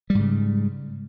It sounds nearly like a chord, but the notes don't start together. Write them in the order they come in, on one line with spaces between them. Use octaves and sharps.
G3 G#2 C#3